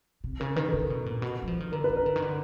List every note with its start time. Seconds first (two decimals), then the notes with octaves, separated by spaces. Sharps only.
0.24 C3
0.40 C#3 A#4
0.56 D#3 B4
0.68 A4
0.73 C#3 A#4
0.90 B2
1.06 A#2
1.22 B2
1.42 F#3
1.47 F3
1.60 D#3
1.72 D3 A#4
1.84 B4
1.89 D#3
1.96 A#4
2.06 D3
2.16 D#3
2.22 D3